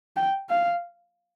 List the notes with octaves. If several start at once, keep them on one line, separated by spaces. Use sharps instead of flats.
G5
F5